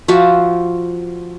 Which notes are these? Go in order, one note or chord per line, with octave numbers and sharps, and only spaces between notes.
F3 F4 F#4 E5